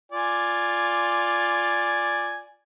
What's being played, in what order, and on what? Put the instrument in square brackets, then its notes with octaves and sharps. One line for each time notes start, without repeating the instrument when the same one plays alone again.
[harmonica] F4 D5 G#5